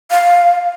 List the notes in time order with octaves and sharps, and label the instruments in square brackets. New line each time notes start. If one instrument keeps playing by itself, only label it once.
[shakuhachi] F5